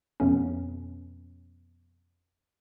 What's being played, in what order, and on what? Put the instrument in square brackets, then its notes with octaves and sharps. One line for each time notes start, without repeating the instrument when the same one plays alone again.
[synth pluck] F2 B2 A3 B3 C#4